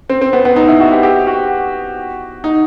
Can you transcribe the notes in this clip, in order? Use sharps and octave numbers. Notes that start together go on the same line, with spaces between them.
C4
C4
B3
B3
D#4
E4
F#4
G4
G4
F#4
D#4